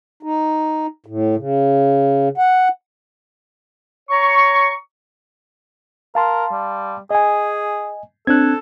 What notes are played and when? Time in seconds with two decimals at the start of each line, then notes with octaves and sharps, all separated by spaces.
0.23 D#4
1.06 A2
1.36 C#3
2.38 F#5
4.10 C#5 A#5 C#6
6.15 A#4 F5 A5 C6
6.51 G3
7.11 G#4 D#5 G#5
8.27 C4 D4 A4 F#6 G#6